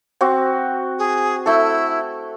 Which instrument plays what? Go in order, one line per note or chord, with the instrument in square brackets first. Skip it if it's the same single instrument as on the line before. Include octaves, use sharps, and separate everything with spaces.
[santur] C4 F#4
[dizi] G#4
[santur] A3 A4 [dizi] E4